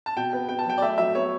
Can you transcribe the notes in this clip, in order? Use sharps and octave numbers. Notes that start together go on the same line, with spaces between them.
A5
B2 G5
B3
B3 G5
A5
F#3 G5
D5
A3 E5
F#3 E5
B3 C#5